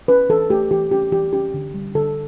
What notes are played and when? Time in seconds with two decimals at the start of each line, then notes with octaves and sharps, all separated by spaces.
0.08 C#4 B4
0.29 E3 A4
0.50 A3 G4
0.71 E3 G4
0.91 C#4 G4
1.12 E3 G4
1.33 C#4 G4
1.54 D3
1.74 G3
1.95 D3 A4